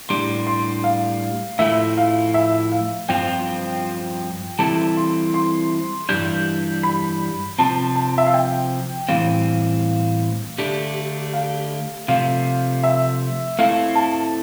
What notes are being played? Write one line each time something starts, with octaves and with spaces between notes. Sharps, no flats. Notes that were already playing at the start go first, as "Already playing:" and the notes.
A2 G3 D4 C6
C6
F5
A2 F3 A3 E4 E5
F5
E5
F5
G2 F3 C4 F4 G5
E3 G3 C4 E4 A4 A5
C6
C6
G2 E3 G3 D4 G6
B5
C3 F3 C4 A5
A5
E5
F5
G5
A2 E3 G3 C4 F5
D3 A3 D4 G4
F5
C3 F3 A3 F5
E5
A3 C4 E4 A4 F5
A5